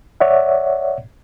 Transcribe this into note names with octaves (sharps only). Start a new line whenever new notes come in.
C#5 D5 E5 F#5